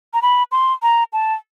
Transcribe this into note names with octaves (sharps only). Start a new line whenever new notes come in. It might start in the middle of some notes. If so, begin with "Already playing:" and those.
A#5
B5
C6
A#5
A5